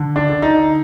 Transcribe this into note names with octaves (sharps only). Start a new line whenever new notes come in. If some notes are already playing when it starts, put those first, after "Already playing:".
Already playing: D3
D4
D3
D#4